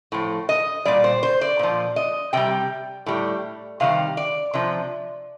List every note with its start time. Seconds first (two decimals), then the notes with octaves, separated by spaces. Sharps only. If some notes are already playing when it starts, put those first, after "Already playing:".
0.12 A2 F3
0.49 D#5
0.85 A#2 G3 D5
1.04 C5
1.23 C5
1.41 D5
1.59 A#2 F3
1.96 D#5
2.33 C3 G3 G5
3.06 A2 G3
3.80 C3 D#3 G3 F5
4.17 D5
4.54 C3 F3